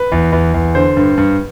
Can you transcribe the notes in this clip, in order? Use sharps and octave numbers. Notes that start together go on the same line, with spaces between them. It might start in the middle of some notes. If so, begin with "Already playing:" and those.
Already playing: B4
E2
E2
E2
D3 C5
G2
G2